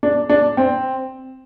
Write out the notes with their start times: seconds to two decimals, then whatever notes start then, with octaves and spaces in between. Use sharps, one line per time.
0.03 D4
0.29 D4
0.57 C4